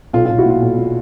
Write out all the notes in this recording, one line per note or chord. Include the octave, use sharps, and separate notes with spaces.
B1 F4
B1 F4
E4 F#4
A#2 F4
B1
A#2